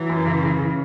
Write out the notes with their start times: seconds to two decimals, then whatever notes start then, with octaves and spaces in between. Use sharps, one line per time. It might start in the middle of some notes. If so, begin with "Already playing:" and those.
Already playing: E3 F#3
0.09 F#2
0.26 C#3
0.43 C#3
0.59 C#3